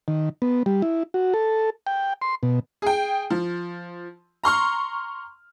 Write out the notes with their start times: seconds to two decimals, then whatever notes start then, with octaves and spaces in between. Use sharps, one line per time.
0.08 D#3
0.42 B3
0.66 G3
0.82 E4
1.14 F#4
1.34 A4
1.87 G5
2.22 C6
2.43 B2
2.82 G#4 G5
3.30 F3
4.44 A#5 C6 C#6 F6